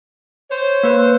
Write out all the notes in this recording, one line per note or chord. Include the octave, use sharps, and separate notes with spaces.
C5 C#5
A#3 B4